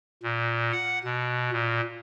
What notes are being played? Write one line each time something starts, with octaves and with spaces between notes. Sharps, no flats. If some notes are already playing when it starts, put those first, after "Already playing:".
A#2
F#5
B2
A#2